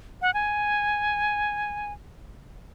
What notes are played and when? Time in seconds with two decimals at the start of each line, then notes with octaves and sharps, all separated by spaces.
0.22 F#5
0.34 G#5